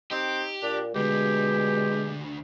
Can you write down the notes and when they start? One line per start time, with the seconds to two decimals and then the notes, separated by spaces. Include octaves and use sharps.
0.11 C4 D#4 G4
0.62 A#2 D4
0.95 D2 B2 D3 G#3 G4